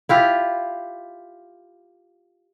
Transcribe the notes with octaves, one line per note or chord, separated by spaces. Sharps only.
E4 F4 G4